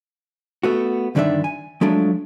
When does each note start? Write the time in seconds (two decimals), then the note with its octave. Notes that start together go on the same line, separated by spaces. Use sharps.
0.63 A3 B3 F#4
1.15 G2 D3 D#3 D4 D5 E5
1.44 G#5
1.81 F3 F#3 G#3 A3 D4